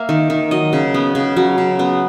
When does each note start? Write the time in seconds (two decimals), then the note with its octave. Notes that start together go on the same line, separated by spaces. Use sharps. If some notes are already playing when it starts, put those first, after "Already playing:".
Already playing: A#3 E5
0.09 D#3
0.30 D#3
0.51 F#3 D#5
0.73 C#3
0.94 B3
1.15 C#3
1.37 F#3
1.58 C#3
1.79 B3